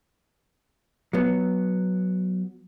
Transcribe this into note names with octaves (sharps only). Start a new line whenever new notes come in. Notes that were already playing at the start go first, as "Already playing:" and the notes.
F#3 B3